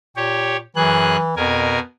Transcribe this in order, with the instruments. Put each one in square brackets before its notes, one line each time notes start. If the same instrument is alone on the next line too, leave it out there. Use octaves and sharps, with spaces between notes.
[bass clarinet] A#2 [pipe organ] G4 C#5
[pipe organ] F#2 G#4 F#6 [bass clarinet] E3
[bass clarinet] F2 [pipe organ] B2 A#4 G#5